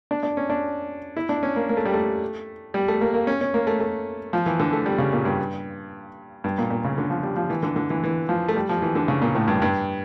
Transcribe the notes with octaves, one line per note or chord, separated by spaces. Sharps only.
D4
D4
C#4
D4
E4
D4
C#4
A#3
A#3
A3
G3
A3
G3
A3
A#3
A#3
C#4
C#4
A#3
A3
A3
F3
E3
D3
A3
G3
C#3
A#2
G2
G2
A#2
A#2
C#3
D3
F3
G3
F3
E3
D3
D3
E3
E3
F3
A3
G3
F3
E3
D3
C#3
A#2
A2
G2
G2